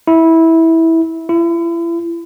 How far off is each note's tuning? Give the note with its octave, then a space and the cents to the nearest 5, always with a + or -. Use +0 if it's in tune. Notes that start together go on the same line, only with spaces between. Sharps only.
E4 -15
E4 +35